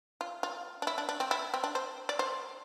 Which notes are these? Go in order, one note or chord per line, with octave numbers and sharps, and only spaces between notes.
F4
F4
D4
E4
D4
D4
C4
E4
C4
D4
C5
D5
C5